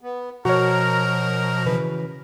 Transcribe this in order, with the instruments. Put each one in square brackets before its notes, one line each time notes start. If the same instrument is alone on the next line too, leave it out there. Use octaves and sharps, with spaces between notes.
[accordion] B3
[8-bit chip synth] B2 F3 [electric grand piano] F#4 C#5 [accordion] A#4 A#5
[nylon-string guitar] C#3 E3 B4